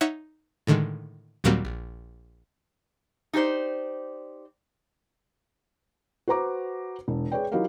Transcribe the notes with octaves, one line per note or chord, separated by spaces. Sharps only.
D#4 C#5 E5 F#5
A2 D3 D#3 G#3
D#2 A#2 F#3 G3 A#3 C4
A#1
D#4 G4 G#4 C5 D5
F#4 B4 C5 A#5 D6
E1
G#4 B4 C#5 D5 G5
F#3 D#4 E4 G4 A#4 F5